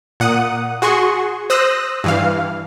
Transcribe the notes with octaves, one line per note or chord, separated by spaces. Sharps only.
A#2 F#5 D#6
F#4 G#4 C6 C#6
C5 D#6 E6 F#6 A#6
G2 E3 F5